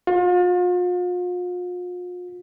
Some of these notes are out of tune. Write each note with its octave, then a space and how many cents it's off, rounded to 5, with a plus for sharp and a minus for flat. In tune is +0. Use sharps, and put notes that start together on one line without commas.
F4 +40